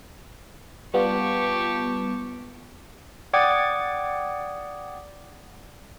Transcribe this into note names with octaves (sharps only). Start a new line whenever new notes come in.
G3 B3 F4 G4 A5 C#6
D5 F#5 G5 D6 D#6 G#6